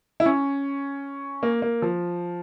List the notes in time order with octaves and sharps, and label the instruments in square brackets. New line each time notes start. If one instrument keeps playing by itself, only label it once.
[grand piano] E4
C#4
A#3
A#3
F3